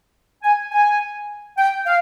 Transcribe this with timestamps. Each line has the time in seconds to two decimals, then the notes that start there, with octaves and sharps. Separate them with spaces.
0.43 G#5
0.72 G#5
1.58 G5
1.86 F5